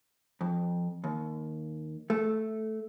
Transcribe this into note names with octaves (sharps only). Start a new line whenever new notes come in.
F2
D#2
A3